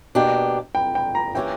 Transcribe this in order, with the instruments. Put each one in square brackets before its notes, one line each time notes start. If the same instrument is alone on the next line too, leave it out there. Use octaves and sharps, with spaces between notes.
[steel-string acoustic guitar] B2 A#3 D4 G4
[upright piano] G5
G5
A#5
[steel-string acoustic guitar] E3 A#3 C#4 G4 [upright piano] G5